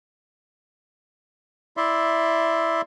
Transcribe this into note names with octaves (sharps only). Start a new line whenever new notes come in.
E4 D5 E5 C6